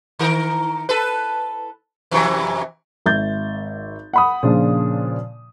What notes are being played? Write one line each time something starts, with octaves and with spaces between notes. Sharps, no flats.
D#3 A#4
A4 B4
F2 C3 E3
G#1 E5 G6 A6
F#5 B5 D#6
A#2 C#3 F3 D4 F4